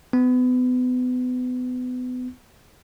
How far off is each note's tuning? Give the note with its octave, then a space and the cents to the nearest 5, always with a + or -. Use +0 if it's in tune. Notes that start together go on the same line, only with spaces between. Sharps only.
B3 +30